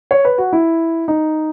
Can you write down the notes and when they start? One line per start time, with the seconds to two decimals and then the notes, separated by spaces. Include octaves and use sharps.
0.11 C#5
0.25 B4
0.38 F#4
0.53 E4
1.08 D#4